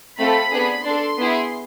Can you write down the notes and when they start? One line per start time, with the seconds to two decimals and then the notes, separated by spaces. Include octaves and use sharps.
0.18 A3 C4 F4 A4 B5
0.51 B3 D4 G#4
0.84 D4 A4 C6
1.18 B3 E4 G#4